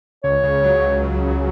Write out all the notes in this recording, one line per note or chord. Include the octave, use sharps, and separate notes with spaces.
C#2 C#5
C#3
F#3
F#3
F#3
C#2